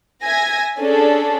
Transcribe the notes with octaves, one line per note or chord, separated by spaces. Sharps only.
E5 G#5 G#6 A#6
C#4 D4 G#4 A4